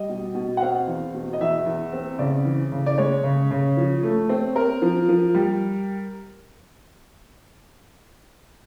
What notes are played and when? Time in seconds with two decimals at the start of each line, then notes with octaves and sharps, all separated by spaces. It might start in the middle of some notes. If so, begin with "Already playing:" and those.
Already playing: G3 D#5
0.09 B2
0.35 B2
0.57 F#5
0.61 C4 F5
0.88 E2
1.14 B2
1.33 D#5
1.41 E2 E5
1.66 E2
1.93 C4
2.19 C#3 D5
2.45 E3
2.72 C#3
2.86 D5
2.98 G#3 C#5
3.24 C#3
3.51 C#3
3.77 F3
4.03 A3
4.29 C4
4.55 C4 A#4
4.82 F3
5.09 F3
5.35 G3